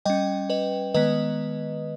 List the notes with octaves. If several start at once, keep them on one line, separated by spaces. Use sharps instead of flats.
G3 C#4 D#5 G5
B4 D#5
D#3 G#3 B3 B4 D#5